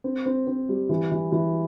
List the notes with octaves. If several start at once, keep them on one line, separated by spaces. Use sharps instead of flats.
C4
C4
C4
G3
E3
E3
E3